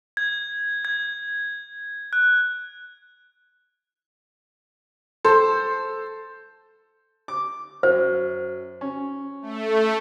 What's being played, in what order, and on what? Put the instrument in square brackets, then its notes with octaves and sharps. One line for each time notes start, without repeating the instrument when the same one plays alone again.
[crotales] G#6
G#6
F#6
[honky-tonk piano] A4 [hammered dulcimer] C5
[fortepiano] D6
[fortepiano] F#2 [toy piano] C5
[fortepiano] C#4
[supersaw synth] A3